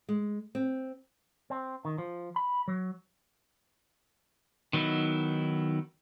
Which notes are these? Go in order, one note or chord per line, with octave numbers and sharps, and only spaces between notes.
G#3
C4
C4
D#3
F3
B5
F#3
D#3 F#3 B3 D#4 E4